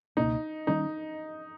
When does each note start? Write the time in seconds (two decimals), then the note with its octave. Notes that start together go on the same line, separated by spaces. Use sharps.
0.17 C#2 B2 A#3 D#4
0.67 D#3 G3 C#4 D#4